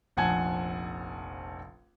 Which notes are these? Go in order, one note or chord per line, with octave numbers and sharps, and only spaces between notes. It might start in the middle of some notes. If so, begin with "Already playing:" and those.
F1 A#1 F#5 G#5 A5 G#6